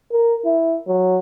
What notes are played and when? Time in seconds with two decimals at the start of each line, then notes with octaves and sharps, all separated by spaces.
0.12 A#4
0.45 E4
0.87 F#3